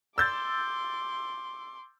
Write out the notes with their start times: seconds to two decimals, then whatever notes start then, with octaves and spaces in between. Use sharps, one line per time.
0.18 C6 D6 E6 G6 A6